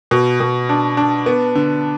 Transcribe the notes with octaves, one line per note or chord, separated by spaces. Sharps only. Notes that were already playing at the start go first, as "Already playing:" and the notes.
B2
B2
D4
D4
B3
D3